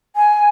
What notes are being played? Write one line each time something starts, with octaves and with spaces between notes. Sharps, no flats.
G#5